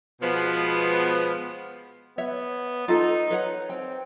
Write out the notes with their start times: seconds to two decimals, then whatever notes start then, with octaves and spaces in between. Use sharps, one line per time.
0.20 B2 F3 G#3 B3
2.18 B3 C#5 E5
2.88 D#4 F4 A4
3.30 B4 C#5 F#5
3.70 C4 G5